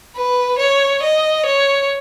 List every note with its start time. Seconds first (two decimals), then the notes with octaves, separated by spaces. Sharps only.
0.16 B4
0.59 C#5
1.03 D#5
1.46 C#5